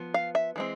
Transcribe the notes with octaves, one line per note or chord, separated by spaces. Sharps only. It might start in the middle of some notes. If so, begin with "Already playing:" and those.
Already playing: F3 B3
F5
E5
E3 G#3 C4